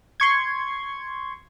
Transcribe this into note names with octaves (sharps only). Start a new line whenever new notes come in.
C6 C#6 G#6